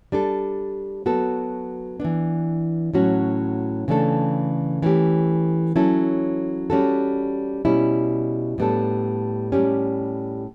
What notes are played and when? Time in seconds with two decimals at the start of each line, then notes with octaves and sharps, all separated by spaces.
0.12 G3 D4 A4
1.06 F#3 B3 F#4 A4
2.00 E3 B3 D4
2.94 A2 F#3 C#4 F#4
3.88 C#3 E3 A3 D4 A4
4.82 E3 A3 C#4 G4
5.76 F#3 C#4 E4 A4
6.70 G3 C#4 F#4 A4
7.65 B2 G3 C#4 E4
8.58 A2 G3 B3 D4 A4
9.52 A2 G3 C#4 G4